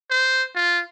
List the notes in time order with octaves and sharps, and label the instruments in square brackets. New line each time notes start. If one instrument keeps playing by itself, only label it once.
[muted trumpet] C5
F4